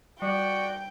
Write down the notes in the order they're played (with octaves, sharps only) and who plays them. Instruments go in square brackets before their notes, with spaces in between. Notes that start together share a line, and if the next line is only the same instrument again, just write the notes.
[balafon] G3 [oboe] F#4 [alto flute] D5 [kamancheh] G5